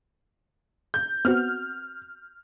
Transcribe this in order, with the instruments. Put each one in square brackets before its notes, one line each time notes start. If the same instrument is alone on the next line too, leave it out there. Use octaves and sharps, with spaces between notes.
[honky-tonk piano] G6
[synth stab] B3 C4 F#4 [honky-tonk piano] F6